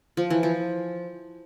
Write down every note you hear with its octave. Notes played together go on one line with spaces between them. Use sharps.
F3
E3
F3